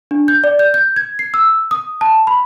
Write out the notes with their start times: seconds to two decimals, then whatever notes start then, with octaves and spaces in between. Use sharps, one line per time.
0.11 D4
0.28 G6
0.44 D5
0.59 G6
0.74 G6
0.96 G#6
1.19 C7
1.34 E6
1.71 D#6
2.01 A5
2.27 B5